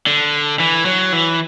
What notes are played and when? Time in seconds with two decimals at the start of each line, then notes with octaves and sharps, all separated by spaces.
0.07 D3
0.60 E3
0.86 F#3
1.13 E3